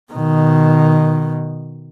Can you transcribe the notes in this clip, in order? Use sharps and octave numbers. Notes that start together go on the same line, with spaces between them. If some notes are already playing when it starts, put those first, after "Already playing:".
B2 D#3